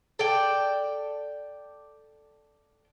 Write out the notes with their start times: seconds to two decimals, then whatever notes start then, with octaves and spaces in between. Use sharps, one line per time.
0.19 A4 D5 G5